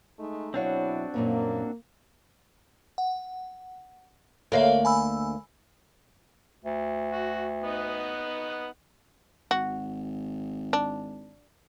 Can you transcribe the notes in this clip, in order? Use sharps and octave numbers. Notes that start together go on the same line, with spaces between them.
G#3 A3 D#4
B2 F#3 C4 D4 E4 F#4 C#5 F5
F#2 A#2 F3 A#3
F#5
D2 A#3 A4 C#5 E5
G#5 B5 E6
D2
F#4
B3 D#4 F#5
G#1 F#4
D4